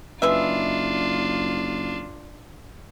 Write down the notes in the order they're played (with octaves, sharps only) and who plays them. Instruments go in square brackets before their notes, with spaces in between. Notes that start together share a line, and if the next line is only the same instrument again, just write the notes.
[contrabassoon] F#1 [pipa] G#3 B4 E5 [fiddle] D4 F4